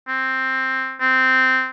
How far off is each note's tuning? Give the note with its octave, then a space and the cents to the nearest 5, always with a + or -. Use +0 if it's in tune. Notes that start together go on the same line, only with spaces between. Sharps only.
C4 +5
C4 -10